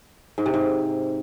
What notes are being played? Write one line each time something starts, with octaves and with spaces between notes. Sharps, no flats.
G#2
C3
G#2